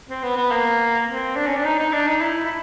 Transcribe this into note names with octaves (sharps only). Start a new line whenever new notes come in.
C4
B3
B3
A#3
C4
D4
C#4
D4
D#4
D#4
D4
D#4
E4
E4